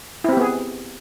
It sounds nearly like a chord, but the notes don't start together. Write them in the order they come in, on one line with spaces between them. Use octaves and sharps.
E4 C4 G4 B3 G#4